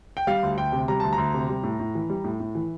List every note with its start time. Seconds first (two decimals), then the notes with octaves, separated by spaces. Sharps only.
0.17 G5
0.27 G3 F5
0.43 D2
0.58 D2 G5
0.72 C3
0.88 G3 A#5
1.00 D2 A5
1.13 A#5
1.18 D2
1.34 C3
1.49 G3
1.63 A2
1.80 A2
1.95 E3
2.10 G3
2.24 A2
2.40 A2
2.55 E3